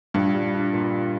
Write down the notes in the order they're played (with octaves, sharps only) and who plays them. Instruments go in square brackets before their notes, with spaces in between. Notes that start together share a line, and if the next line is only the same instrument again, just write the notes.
[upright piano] A#1 [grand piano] G2
[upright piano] G3
D4
A#2